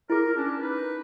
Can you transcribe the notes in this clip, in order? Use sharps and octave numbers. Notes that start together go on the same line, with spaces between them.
E4 G#4 A#4
C#4 D4
D#4 B4